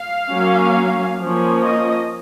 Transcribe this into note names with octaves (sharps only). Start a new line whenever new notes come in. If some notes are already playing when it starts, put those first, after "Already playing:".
Already playing: F5
F#3 A#3 C#4
F3 A#3 C#4
D#5